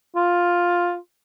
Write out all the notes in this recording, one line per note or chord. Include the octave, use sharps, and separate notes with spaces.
F4